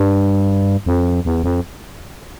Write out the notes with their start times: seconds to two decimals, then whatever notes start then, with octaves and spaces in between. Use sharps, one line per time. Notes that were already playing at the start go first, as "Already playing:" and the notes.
Already playing: G2
0.86 F2
1.25 E2
1.43 F2